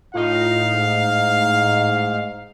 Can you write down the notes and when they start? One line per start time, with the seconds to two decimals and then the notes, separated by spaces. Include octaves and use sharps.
0.15 A2 D#4 F4 F5
0.73 G#2